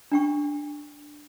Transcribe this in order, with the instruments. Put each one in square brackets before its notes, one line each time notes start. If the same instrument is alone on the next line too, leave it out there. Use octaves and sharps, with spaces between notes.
[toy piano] D4 G5 C#6